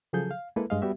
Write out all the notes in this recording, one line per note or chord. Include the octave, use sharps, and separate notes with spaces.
C#3 F3 F#3 G#4 A4 G6
F5
G#3 A#3 E4 A4 B4
G2 G#3 D#5 F5
G3 B3 F#4 G4 E5